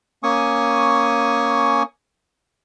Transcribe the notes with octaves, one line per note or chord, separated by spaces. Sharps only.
A#3 C#4 G#5 C#6 D#6